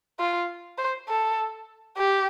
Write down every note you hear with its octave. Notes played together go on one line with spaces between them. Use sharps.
F4
C5
A4
G4